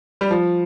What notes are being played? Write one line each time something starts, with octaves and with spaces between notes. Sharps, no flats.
G3
F3